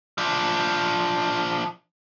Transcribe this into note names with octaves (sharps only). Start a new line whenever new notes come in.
F3 D4